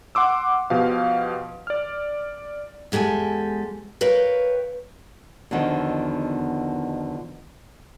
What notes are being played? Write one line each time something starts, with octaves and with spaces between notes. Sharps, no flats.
F#5 C6 D6 E6
B2 F3 G4 F5
D5 F6
E2 G#3 G4 A4 G#5
A#4 B4 C#5 F5 G5
E2 B2 D3 D#3 F3